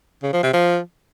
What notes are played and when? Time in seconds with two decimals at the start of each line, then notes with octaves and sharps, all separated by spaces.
0.23 C#3
0.33 F3
0.43 C3
0.53 F3